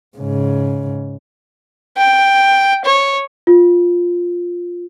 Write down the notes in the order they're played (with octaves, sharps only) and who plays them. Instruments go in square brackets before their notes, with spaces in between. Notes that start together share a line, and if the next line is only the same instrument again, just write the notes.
[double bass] G#2 C#3
[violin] G5
C#5
[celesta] F4